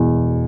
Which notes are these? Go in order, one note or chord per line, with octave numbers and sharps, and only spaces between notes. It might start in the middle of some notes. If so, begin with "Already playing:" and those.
Already playing: E1 E2 B2